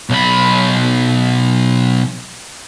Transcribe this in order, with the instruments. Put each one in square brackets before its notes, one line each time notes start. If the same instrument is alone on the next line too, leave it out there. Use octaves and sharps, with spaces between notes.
[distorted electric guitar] B1 B5